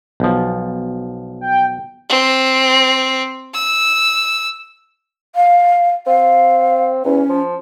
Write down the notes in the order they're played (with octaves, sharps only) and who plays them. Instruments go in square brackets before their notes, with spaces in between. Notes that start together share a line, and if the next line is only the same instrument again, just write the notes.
[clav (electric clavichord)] B1 F3
[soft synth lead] G5
[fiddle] C4
E6
[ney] F5
[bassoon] C4 [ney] F5
[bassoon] E2 [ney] C#4
[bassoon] F3